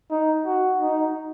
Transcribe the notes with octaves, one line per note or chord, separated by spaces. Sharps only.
D#4
F#4
D#4